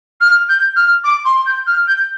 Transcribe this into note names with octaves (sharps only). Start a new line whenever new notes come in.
F6
G6
F6
D6
C6
G6
F6
G6